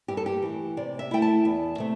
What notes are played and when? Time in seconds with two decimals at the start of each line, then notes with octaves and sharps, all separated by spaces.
0.08 G2 G4
0.17 A4
0.26 G4
0.42 E3 A3
0.77 C3 D5
0.99 E5
1.11 A3 E4 G5
1.22 A5
1.45 E2
1.78 C3 A3